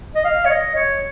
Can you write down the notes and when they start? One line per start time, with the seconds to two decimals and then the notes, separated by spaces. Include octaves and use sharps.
0.15 D#5
0.25 F5
0.45 C#5
0.50 D#5
0.75 C#5